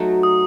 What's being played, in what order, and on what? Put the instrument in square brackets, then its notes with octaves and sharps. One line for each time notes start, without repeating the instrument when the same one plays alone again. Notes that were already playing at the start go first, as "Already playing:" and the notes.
Already playing: [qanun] F#3 A3 D#4 F#4
[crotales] D#6